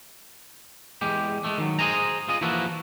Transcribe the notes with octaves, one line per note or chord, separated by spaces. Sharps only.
E2 G#3 G4
G#3 A3
D#3 F#3
G#4 A4 C5 D#5 G#5 A#5
F4 G#4 D#5
E3 F3 A#3 E4 F#4 A4